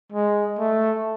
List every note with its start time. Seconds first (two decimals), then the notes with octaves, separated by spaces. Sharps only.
0.12 G#3
0.59 A3